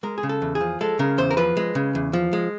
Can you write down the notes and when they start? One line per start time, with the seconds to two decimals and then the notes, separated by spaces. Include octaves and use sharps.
0.03 G#3 A#4
0.18 G#4
0.23 C#3
0.29 A4
0.42 E2
0.55 G#4
0.61 F3
0.81 G#3 A4
0.99 C#3 A#4
1.18 E2 C5
1.31 A#4
1.37 F3 B4
1.57 G#3
1.75 C#3
1.95 E2
2.13 F3
2.33 G#3